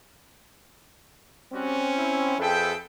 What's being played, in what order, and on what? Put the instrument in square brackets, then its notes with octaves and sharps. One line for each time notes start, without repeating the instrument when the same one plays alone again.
[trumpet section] G3 F#4 [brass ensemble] C4 C#4
[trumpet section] E4
[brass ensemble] F2 G#4 A4 [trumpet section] B4 E5 G5